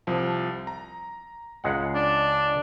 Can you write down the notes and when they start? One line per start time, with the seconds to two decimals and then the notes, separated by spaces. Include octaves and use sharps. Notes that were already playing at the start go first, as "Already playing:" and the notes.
0.07 C2 F3 A5
0.67 A#5
1.64 C#2 G#3 F#5
1.95 D4